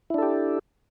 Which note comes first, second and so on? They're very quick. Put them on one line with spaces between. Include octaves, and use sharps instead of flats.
E4 D4 A4 G4